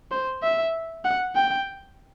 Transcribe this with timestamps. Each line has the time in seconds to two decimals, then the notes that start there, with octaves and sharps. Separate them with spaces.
0.11 C5
0.43 E5
1.04 F#5
1.35 G5